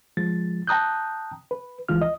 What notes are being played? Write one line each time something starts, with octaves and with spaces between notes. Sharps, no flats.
F3 G#3 A6
G5 A5 A#5 D#6 F#6 G6
B4
C#2 E3 F3 G#3 F4 F6
D#5